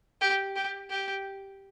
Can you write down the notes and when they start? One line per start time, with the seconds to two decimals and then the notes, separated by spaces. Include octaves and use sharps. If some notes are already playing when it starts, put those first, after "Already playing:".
0.21 G4
0.56 G4
0.90 G4